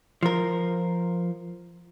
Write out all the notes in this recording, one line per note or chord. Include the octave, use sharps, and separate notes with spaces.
F3 A#4